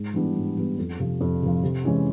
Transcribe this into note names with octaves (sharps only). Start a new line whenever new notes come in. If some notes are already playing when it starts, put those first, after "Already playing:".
Already playing: G#2
E3 G3 B3 D4
G#2
E3 G3 B3 D4
F2
C3 F3
F2
C3 F3
C3
E3 G#3 C#4 E4